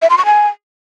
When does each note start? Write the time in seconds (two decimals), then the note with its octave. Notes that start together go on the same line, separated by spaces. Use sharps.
0.02 E5
0.10 C6
0.18 C#6
0.26 G#5